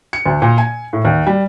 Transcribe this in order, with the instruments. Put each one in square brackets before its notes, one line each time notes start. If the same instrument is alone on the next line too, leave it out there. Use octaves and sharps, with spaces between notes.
[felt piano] C#7
D2
A#2
G#5
A2
D#2
G3